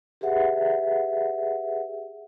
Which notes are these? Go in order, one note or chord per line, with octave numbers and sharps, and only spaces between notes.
G4 G#4 B4 E5 F#5